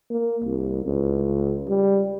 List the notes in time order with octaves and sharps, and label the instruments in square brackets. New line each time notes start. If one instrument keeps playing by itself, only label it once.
[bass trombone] A#3
C2
C#2
G3